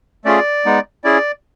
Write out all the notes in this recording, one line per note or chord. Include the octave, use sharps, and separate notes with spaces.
A3 C#4 F4 G#4 D5
G#3 B3 D#4
C#4 E4 G#4 D5